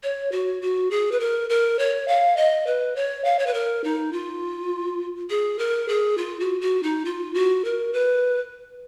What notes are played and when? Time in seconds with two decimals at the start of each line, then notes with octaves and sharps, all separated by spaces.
0.03 C#5
0.32 F#4
0.62 F#4
0.91 G#4
1.12 B4
1.20 A#4
1.50 A#4
1.79 C#5
2.08 F5
2.37 D#5
2.67 B4
2.96 C#5
3.24 F5
3.39 C#5
3.47 B4
3.54 A#4
3.84 D#4
4.13 F4
5.30 G#4
5.59 A#4
5.88 G#4
6.17 F4
6.40 F#4
6.61 F#4
6.83 D#4
7.05 F4
7.34 F#4
7.65 A#4
7.93 B4